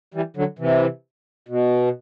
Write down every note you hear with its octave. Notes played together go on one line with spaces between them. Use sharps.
E3 G3
D3 F#3
C3 E3
B2